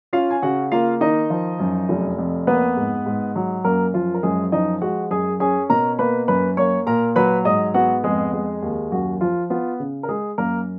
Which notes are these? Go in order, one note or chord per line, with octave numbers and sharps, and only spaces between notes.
C#4 F4 F5
G#5
C#3 F#4 F#5
A#3 F4 F5
D#3 D#4 D#5
F3
F#2
F1
F2
A#3 B3 B4
G#2
G#2
F#3
F#2 A#3 A#4
F3 F4
A#4
F#2 G#3 G#4
F3 D#4 D#5
G#3 F#4 F#5
F#2 G#4 G#5
C#4 G#4 G#5
B2 A#4 A#5
A#3 B4 B5
F#2 B4 B5
A#3 C#5 C#6
A#2 A#4 A#5
F#3 B4 B5
G#2 D#5 D#6
B3 F#4 F#5
F2 G#3 G#4
G#3
D#2
F#2 F#4
F3 F4
B3 F4
C#3
A#4
G#3 G#4
F#2 A#3 A#4